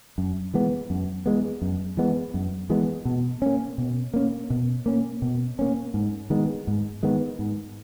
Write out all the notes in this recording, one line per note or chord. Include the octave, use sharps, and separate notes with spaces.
F#2
E3 G#3 B3
F#2
E3 G#3 B3
F#2
E3 G#3 B3
F#2
E3 G#3 B3
B2
A#3 C#4
B2
A#3 C#4
B2
A#3 C#4
B2
A#3 C#4
G#2
D#3 G#3 B3
G#2
D#3 G#3 B3
G#2